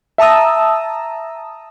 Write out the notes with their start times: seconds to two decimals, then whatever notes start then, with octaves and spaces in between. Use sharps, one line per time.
0.18 E5 A5 A#5 D#6 E6